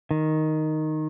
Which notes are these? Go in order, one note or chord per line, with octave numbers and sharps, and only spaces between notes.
D#3